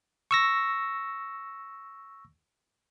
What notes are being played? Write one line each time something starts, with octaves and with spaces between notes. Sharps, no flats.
C#6 E6 A#6